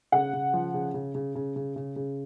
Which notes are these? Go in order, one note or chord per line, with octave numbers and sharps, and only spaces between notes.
C#3 F#5
C#3
F3
C#3
C#3
C#3
C#3
C#3
C#3
C#3